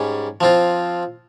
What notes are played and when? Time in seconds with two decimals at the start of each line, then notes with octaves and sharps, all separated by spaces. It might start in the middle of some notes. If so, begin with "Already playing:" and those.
Already playing: G#2 G3 C#4
0.41 F3 C4 F4